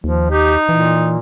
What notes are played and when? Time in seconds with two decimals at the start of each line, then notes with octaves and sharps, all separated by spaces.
0.04 D#2 F3
0.30 D#4 G4
0.69 A#2 E3